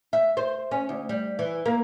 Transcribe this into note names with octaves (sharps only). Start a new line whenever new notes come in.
E5
C5
C#4
D2
G3
E3
A#3